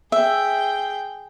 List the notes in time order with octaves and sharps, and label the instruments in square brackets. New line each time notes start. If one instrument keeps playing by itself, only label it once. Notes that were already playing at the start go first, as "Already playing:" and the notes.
[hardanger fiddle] G#4 G5 [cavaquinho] E5